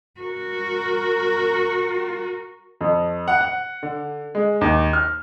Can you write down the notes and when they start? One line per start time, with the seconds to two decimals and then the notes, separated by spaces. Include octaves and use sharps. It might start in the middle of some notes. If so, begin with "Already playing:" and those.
0.20 F#4 A#4
2.81 F2
3.28 F#5
3.41 F#5
3.83 D3
4.35 G#3
4.61 D#2
4.93 F6